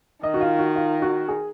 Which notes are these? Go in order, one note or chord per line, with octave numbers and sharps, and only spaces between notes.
D#3 D#5
F#4
F4
F#4
F4
F#4
G#4